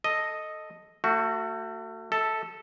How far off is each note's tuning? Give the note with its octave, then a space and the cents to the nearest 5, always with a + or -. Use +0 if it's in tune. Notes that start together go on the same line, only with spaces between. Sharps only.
A4 +0 D#5 +0
A3 +30 F#4 +0
A4 +0 E5 -35